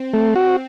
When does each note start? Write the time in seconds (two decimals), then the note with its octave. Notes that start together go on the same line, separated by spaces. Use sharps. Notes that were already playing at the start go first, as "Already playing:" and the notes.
Already playing: C4
0.13 A3
0.36 F#4